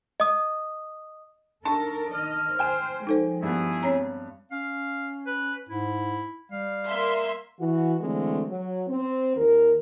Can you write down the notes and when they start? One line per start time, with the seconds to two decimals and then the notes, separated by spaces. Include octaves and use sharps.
0.20 D#5 D#6
1.65 D4 D#4 A4 A#4 A5 C#6
2.13 D#3 D#5 F6
2.59 C5 G5 G#5 E7
3.07 F3 G#3 D#4 A4 C5
3.43 G2 A3 B3 E4 G#4
3.83 C4 C#5 A#5
4.52 C#4 F5
5.26 B4
5.69 G#2 E4
6.52 G3 F5
6.88 A#3 E5 C6
7.58 E3 F#4
8.01 D3 E3 G#3 A3 C4
8.47 F#3
8.87 C4
9.35 D#2 D#3 A#4